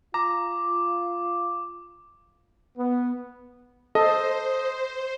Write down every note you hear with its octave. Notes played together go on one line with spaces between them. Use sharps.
F4 A#5 D6
B3
A4 C5 D#5